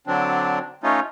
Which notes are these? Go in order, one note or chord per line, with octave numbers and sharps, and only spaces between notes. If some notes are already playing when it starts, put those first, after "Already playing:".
D3 F#3 C4 D4
A3 C#4 D#4 F4